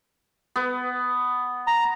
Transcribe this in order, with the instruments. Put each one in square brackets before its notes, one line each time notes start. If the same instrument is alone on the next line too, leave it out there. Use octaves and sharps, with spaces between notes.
[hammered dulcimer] B3
[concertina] A#5